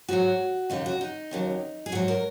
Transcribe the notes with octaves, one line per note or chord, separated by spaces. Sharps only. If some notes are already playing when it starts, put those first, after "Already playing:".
G#2 F#3 F#4
D#2 C#3 F#3 D#4
F#4
D#4
D#2 C#3 F#3
G#4
G#2 F#3 F#4
A#4